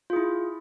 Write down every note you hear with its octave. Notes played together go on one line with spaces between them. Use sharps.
E4 F4 G#4